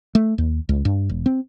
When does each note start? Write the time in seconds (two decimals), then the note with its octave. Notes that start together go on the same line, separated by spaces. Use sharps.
0.15 A3
0.38 D#2
0.69 C#2
0.85 G2
1.09 E1
1.26 C4